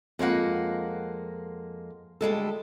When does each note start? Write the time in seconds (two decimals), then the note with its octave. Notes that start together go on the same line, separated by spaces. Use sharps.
0.19 F2 G#3 A#3 F#5
2.21 D2 G3 G#3 A4